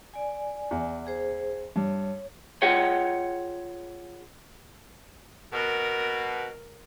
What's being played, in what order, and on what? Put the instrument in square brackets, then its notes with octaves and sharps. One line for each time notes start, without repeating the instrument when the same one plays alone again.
[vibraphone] D5 G#5
[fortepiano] E2
[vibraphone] G#4 C5
[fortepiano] G2 [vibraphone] C#5
[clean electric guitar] F4 G#4 C#5 F#5 G5
[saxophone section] B2 [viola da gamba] A#4